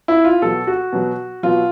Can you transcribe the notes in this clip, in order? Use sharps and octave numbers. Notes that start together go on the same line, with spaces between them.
E4
F4
B2 F#3 A4
F#4
B2 F#3
B2 F#3 F4